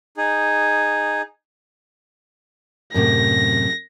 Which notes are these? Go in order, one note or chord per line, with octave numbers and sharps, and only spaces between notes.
D#4 G#4
F#2 A2 C3 A#6